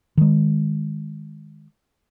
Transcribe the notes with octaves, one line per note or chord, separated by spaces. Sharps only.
D#3 G#3